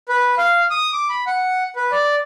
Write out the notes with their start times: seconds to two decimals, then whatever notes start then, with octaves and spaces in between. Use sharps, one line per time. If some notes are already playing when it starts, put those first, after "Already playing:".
0.09 B4
0.38 F5
0.70 D#6
0.93 D6
1.09 B5
1.27 F#5
1.76 B4
1.92 D5